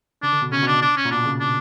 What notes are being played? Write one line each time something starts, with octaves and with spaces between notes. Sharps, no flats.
C#3 D4
D3
B2
C#3 C#4
B2
D4
D4
C#4
A#2
B2 D4
C#3
D4